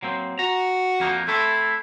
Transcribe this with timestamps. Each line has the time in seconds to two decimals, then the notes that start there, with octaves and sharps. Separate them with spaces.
0.03 F#3 A#3 C4
0.39 F#4 A#5
1.00 F2 A#3 D#4
1.28 A3 C4 E4 A4